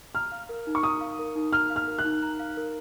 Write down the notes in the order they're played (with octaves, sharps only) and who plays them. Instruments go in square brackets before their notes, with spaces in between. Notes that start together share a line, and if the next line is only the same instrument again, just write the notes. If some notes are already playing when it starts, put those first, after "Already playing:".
[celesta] A#5 [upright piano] F6
[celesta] F5
A#4
D#4
[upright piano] C#6
[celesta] A#5 [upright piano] D#6
[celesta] F5
A#4
D#4
[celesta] A#5 [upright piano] F6
[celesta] F5
[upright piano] F6
[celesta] A#4
[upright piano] F#6
[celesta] D#4
A#5
F5
A#4